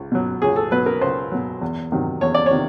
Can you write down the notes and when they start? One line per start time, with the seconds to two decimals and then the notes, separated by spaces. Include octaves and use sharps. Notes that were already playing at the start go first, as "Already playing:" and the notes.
Already playing: C#2
0.12 B2 F#3
0.42 C#2 G#4
0.56 A4
0.71 B2 F#3 B4
0.86 A#4
1.01 C#2 C5
1.32 B2 F#3
1.61 E2
1.92 C3 D#3 F#3
2.21 E2 C#5
2.35 D5
2.46 C#5
2.51 C3 D#3